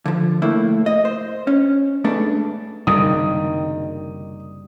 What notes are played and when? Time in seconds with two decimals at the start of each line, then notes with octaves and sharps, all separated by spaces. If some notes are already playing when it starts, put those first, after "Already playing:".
0.06 D3 F3
0.42 A2 A#3 E4
0.86 D#5
1.05 C5
1.47 C#4
2.04 G#2 A3 B3 D4
2.87 F#1 G2 C3 D#3 G3 D#6